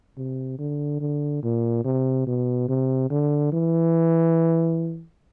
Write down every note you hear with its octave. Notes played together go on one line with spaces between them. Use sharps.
C3
D3
D3
A#2
C3
B2
C3
D3
E3